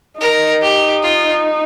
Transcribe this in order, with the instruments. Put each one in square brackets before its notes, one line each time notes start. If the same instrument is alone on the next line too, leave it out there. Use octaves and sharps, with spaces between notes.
[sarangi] D#4 [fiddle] A#4
[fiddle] G4
F4